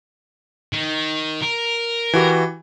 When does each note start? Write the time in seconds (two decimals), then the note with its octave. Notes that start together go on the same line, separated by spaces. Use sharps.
0.73 D#3
1.42 A#4
2.13 E3 F#4 G4